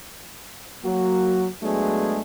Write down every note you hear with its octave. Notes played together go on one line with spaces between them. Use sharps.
F#3 A#3 F#4
F#3 G#3 A3 B3 D4 G#4